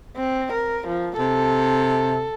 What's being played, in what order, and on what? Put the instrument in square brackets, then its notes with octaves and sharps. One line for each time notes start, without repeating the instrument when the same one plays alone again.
[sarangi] C4
A#4
F3
[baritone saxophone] C3 [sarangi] A4